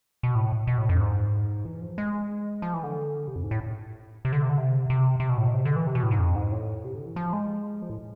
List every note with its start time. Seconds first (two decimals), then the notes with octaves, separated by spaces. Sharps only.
0.23 B2
0.35 A2
0.67 B2
0.78 A2
0.89 F2
1.00 G#2
1.65 E3
1.81 F3
1.98 G#3
2.62 F3
2.74 E3
2.83 D3
3.28 C3
3.36 F2
3.43 G#2
3.51 A2
4.25 C3
4.33 D3
4.42 C3
4.49 D3
4.58 C3
4.90 C3
5.20 C3
5.29 B2
5.38 A2
5.48 B2
5.54 C3
5.65 D3
5.76 E3
5.87 C3
5.95 B2
6.03 A2
6.11 G#2
6.19 F2
6.35 G#2
6.52 A2
6.85 C3
6.95 D3
7.06 E3
7.16 F3
7.33 G#3
7.82 F3
7.90 A2